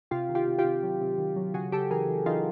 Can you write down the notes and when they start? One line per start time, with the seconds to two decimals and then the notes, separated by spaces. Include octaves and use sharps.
0.11 C3 F4 G4
0.29 D#3
0.35 F4 G4
0.47 C3
0.59 F4 G4
0.64 C3
0.83 F#3
1.01 C3
1.18 D#3
1.36 F#3
1.54 C#3 F#4 G#4
1.72 C#3 G4 A4
1.91 E3 G#4 A#4
2.08 E3
2.26 E3 D#4 F4